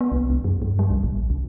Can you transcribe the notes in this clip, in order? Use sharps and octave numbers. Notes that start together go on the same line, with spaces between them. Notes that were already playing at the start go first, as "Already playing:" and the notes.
B3
C2
C2
F#2
G2
G3
C2
A1
C2